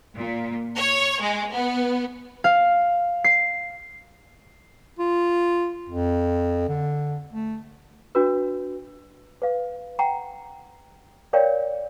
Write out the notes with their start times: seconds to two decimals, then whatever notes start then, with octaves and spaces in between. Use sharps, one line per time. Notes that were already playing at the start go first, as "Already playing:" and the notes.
0.16 A#2
0.77 C#5
1.21 G#3
1.52 B3
2.44 F5
3.24 C7
4.99 F4
5.89 F2
6.68 D3
7.33 A3
8.15 D4 F#4 B4
9.42 B4 F5
9.99 F#5 G5 A#5
11.33 A#4 C#5 D5 F5 G5